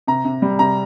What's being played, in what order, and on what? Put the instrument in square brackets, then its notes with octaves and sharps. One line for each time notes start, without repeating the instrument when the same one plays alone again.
[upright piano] C3 A#5
C3
G3
C3 A#5